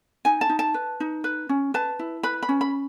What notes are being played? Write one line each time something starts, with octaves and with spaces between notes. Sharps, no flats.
D#4 G#5
A5
D#4
A5
B4
D#4
B4
C#4
B4 A5
E4
B4 B5
B5
C#4
B5